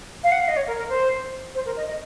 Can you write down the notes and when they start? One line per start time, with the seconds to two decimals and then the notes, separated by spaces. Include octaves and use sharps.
0.24 F5
0.32 F#5
0.40 F5
0.48 D#5
0.57 C#5
0.67 A#4
0.78 A#4
0.89 C5
1.55 C5
1.66 A#4
1.77 D#5
1.88 D#5